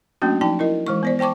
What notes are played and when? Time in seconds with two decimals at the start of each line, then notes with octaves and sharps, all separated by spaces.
0.22 F#3 A3 A#3 C#4 D4 F#4
0.41 F3 D#4 G5 A5
0.59 E4 A#4 D#5
0.87 E3 G#3 C#6
1.03 B3 C5 D5
1.19 C5 G5 A5 C#6 D6